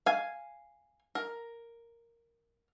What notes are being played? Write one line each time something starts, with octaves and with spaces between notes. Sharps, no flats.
F5 G#5
A#4